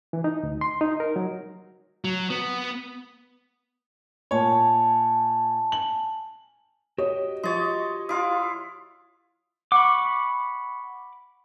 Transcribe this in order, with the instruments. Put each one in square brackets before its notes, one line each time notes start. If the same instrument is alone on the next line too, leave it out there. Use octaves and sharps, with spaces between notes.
[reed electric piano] E3
D#4
D2
C6
D#4
A#4
F#3
[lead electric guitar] F#3
B3
[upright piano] A#2 C#5 [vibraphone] G#5 A5
[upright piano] F#7
[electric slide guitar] F#4 G4 [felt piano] C#5 [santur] D#5
[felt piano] F3 [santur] C#5 D#5 [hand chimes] C6 A6
[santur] E4 F4 F5 [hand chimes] C6 D#6
[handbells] F#5 C#6 [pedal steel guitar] B5 D6